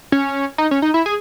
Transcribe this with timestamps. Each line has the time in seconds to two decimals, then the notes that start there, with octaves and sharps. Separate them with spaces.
0.12 C#4
0.58 D#4
0.71 C#4
0.82 D#4
0.94 E4
1.06 G#4